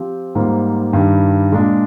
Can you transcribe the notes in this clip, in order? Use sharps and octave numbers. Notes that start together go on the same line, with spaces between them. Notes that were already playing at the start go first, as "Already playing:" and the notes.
Already playing: F3 C4 G4
G#2 G3 A#3 F4 C5
G2 D#3 G3
A#2 G#3 D4